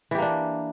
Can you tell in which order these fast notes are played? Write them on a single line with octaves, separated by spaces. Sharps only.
E3 G4 A#3 D4